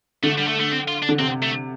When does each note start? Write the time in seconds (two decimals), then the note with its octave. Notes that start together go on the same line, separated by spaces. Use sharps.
0.23 D3 A3
0.38 G3
0.47 A3
0.60 A3
0.71 C4
0.88 F4
1.03 D4
1.09 D3
1.19 C3 C4
1.43 A3